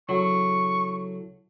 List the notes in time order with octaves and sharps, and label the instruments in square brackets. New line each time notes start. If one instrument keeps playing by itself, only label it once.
[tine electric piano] C#3 E4 A4 [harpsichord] F#3 [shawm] C#6